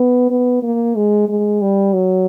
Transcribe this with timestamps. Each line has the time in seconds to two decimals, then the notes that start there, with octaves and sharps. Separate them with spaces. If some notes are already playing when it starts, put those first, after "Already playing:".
Already playing: B3
0.30 B3
0.63 A#3
0.96 G#3
1.29 G#3
1.61 G3
1.94 F#3